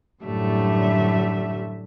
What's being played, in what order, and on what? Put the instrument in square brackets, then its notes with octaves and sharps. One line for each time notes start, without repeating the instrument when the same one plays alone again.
[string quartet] F#2 A2 D3 G3 A3 E5